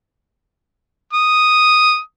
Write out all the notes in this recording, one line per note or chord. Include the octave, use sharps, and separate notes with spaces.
D#6